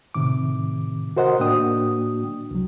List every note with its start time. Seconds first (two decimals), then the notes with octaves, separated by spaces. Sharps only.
0.15 A2 C3 D#3 D6
1.17 F#4 A#4 C5 D#5 F#5
1.40 A2 A#3 D4 F#4 G5 D#6
2.51 C2 F#3